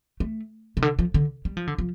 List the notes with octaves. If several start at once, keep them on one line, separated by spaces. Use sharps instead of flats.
A3
C3
D3
F3
D3
G3
F3
D3
F3